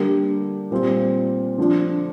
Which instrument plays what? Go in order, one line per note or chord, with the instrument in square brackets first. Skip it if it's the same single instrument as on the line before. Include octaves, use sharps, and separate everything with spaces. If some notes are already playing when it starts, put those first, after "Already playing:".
Already playing: [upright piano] D3 G3 A#3 G4
A#2 G3 C4 F4
D3 F3 D4